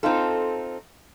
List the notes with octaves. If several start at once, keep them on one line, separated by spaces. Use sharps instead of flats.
C4 D#4 F4 A4